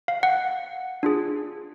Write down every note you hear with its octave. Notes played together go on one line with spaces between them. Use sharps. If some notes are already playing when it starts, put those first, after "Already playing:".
F5
F#5
D4 F4 G#4